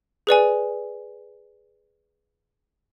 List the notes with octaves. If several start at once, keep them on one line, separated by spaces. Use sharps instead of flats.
G#4 B4 D5 G#5